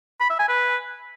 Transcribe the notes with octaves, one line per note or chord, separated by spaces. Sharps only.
B5
E5
G#5
B4